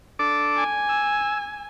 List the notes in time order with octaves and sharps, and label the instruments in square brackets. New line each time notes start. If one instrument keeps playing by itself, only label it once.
[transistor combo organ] D4 A4 D6
[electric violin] G#5
[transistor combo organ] E6